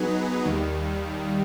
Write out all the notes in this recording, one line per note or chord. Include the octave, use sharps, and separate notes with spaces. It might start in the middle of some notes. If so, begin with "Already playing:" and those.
Already playing: F#3 B3 D#4 G#4 B4
D#2 D#3 G3